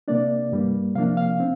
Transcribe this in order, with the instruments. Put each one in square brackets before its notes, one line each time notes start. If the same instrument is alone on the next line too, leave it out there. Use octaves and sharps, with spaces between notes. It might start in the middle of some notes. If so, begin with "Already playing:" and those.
[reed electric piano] C3 A#3 D4 D5
G2 G3 A#3
C3 F3 A#3 D4 F5
F5
C4